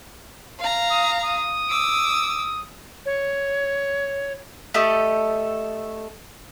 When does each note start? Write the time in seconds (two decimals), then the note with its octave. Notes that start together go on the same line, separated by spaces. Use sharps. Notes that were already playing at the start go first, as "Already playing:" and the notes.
0.59 F5 A#5
0.90 D#6
1.23 D#6
1.69 D6 E6
3.06 C#5
4.74 A3 G4 A4 D#5